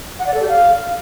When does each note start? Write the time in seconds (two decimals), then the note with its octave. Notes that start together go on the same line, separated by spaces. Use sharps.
0.19 F#5
0.27 D5
0.34 A4
0.41 G4
0.48 F5